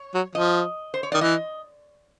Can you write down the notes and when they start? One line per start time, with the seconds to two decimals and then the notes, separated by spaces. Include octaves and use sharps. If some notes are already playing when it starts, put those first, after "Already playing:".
Already playing: C#5
0.14 F#3
0.35 F3 D#5
0.94 C5
1.03 C#5
1.12 D#3 D5
1.21 E3 D#5